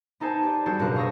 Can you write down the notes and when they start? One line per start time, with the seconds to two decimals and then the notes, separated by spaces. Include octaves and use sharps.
0.20 B3 D#4 A4 C5 G#5 A5
0.43 G4 D5
0.66 G3 D4 F#4 G#4 A4 C5
0.79 F#1 B2 A#4 F5 F#6
0.95 F5 C#6 D#6 E6 A#6